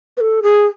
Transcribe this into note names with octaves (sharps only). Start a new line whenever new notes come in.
B4
A4
G#4